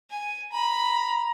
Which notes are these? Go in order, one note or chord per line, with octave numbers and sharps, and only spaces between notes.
G#5
A#5 B5